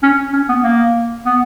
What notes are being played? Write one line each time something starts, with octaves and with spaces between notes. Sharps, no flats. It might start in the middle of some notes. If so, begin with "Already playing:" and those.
C#4
C#4
B3
A#3
B3